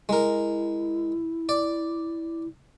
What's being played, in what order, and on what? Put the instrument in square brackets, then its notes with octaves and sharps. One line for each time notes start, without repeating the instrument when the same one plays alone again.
[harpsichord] G#3 A#4 [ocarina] E4
[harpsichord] D5